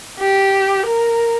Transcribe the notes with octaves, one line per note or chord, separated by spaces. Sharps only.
G4
A#4